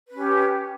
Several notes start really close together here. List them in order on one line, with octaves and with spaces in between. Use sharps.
B4 C#4 G4